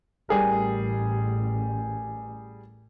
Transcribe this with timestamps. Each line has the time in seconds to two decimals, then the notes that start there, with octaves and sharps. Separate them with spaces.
0.29 A1 G3 G#4 A#4